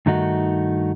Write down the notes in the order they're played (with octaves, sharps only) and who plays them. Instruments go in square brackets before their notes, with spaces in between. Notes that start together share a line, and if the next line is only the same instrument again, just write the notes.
[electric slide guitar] G2 D#3 A3 D#4 F#4